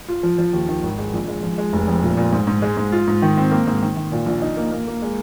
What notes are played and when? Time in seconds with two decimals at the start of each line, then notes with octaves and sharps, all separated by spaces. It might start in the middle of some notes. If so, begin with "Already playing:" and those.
0.08 F4
0.23 F3
0.38 F3
0.53 D#2
0.68 D#3
0.83 G#1
0.98 G#3
1.13 A#1
1.28 G#3
1.43 F3
1.58 G#3
1.73 F1
1.88 F2
2.03 A#2
2.17 A#2
2.33 G#2
2.47 G#2
2.62 G#3
2.77 G#2
2.92 F4
3.08 G#2
3.22 D#3
3.38 C4
3.51 A#3
3.67 G#2
3.82 D#3
3.97 D#3
4.12 A#2
4.26 A#1
4.42 D#4
4.57 A#3
4.71 A#3
4.87 A#3
5.02 G#3